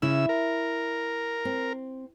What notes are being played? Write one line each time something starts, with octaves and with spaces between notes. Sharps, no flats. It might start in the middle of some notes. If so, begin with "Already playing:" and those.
C#3 E4 E6
A#4
C4